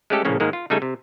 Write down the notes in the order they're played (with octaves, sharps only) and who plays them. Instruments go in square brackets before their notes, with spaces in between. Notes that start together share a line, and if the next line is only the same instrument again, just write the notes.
[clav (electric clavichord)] G#3 A3 C#4 G4 A4
A#1 A2 C#3 A#3 C#4
G#2 D#3 G#3 A#3
F4
C#3 G3 A3 D#4 A4 G#5
C3